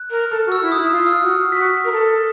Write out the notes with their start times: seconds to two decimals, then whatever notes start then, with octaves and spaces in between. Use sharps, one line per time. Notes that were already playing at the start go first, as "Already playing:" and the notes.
Already playing: F#6
0.11 A#4
0.31 A4 F6
0.46 F#4
0.52 E6
0.62 E4
0.72 D#6
0.77 E4
0.92 F4 E6
1.06 E6
1.12 F6
1.23 F#4
1.32 F6
1.52 F#4 B6
1.85 A#4
1.92 A4